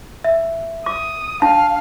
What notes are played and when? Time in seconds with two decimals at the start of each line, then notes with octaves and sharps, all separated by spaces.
0.24 E5
0.86 D6 D#6
1.42 D4 F5 A5